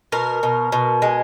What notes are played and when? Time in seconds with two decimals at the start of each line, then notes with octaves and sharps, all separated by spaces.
0.12 B2 A#4
0.43 B2
0.72 B2
1.02 G#3